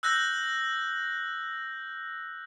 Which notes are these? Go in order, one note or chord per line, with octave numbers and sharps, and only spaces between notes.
E6 F#6 G6 A#6